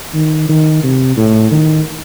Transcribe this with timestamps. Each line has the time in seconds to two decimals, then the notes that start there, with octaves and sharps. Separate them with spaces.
0.14 D#3
0.49 D#3
0.84 C3
1.17 A2
1.52 D#3